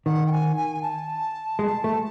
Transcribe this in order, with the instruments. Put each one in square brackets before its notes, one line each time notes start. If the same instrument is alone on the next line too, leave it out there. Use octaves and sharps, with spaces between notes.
[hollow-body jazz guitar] D#3 [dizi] F#5
[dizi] G5
G#5
G#5
A5
[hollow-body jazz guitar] G#3
A3